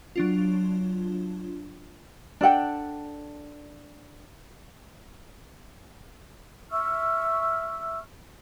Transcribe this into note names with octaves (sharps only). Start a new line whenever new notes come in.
F#3 D4 F4
D4 A4 F#5 G5
E5 C#6 E6 F6